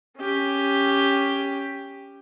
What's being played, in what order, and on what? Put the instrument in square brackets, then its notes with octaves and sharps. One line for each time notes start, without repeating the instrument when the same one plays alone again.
[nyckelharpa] C#4 G4